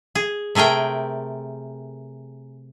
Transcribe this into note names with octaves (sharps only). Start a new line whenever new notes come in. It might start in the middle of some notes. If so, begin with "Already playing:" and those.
G#4
C3 A3 G#4 A#4 G5